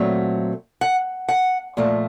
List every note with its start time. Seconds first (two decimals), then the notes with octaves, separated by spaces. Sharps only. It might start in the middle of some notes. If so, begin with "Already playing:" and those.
Already playing: A#2 F#3 A3 C4
0.81 F#5
1.29 F#5
1.77 A#2 F3 A3